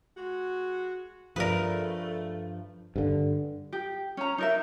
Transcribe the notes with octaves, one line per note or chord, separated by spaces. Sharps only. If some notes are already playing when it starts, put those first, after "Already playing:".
G#3 F#4
G2 F3 A3 G#4 A#4 B4 D5
G2 D3
G4
C#4 A#5
D#4 A#4 E5